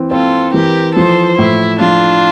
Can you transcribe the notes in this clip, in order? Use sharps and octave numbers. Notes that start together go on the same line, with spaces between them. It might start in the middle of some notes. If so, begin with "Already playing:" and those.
Already playing: E3 C4
C4 F4 A4
E3 G4 A#4
F3 A4 C5
A2 E4
F3 D4 F4